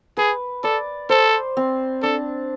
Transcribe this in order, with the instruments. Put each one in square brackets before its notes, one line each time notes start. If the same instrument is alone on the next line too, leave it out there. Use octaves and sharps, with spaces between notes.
[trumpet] G#4 [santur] B4
[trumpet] A4 [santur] D5
[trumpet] A4 [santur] C5
[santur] C4
[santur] D4 [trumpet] A4